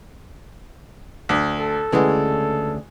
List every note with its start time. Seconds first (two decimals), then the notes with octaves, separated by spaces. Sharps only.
1.29 D2
1.60 A4
1.92 D2 C#3 E3 G#3